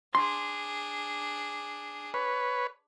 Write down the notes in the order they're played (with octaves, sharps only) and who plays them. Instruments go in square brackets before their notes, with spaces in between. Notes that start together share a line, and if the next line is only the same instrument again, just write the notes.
[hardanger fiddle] D4 G#4 [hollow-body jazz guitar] C6
[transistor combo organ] B4 C#5